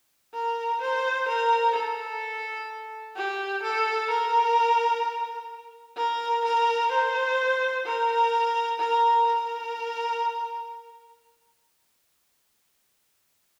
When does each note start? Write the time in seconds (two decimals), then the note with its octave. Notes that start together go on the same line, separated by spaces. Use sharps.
0.34 A#4
0.81 C5
1.28 A#4
1.75 A4
3.16 G4
3.63 A4
4.10 A#4
5.97 A#4
6.44 A#4
6.92 C5
7.85 A#4
8.79 A#4
9.27 A#4